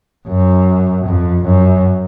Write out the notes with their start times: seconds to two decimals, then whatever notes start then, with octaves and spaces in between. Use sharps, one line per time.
0.28 F#2
1.05 F2
1.45 F#2